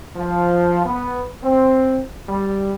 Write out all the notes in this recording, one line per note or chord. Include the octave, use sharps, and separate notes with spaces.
F3
B3
C4
G3